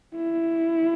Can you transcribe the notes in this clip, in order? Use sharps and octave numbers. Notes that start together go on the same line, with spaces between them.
E4